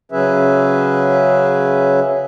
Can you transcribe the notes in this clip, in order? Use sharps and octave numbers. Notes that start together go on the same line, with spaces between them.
C#3 F#3 C#4 G#4 B4 E5